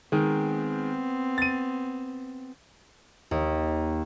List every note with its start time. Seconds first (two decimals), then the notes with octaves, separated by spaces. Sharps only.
0.12 D#3 G#3 B3 C4
1.38 A6 D#7
3.31 D#2